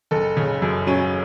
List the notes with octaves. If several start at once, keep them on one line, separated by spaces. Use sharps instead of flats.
F#1 A4
C#3
F#2
F#3 C#4